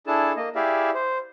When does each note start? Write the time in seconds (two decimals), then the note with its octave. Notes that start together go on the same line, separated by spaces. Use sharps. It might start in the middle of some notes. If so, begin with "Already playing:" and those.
0.07 D4 E4 G#4 A4 A5
0.37 A#3 D#5
0.55 E4 G4 G#4 D5 E5 F5
0.94 C5